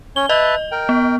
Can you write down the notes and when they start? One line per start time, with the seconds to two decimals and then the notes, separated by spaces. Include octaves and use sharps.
0.16 C#4 C#5 G7
0.29 B4 D#5 E5 A5
0.72 A#4 G5
0.89 B3